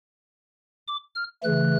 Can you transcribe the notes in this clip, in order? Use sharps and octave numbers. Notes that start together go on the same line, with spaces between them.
D6
F6
C#3 E3 A3 F#6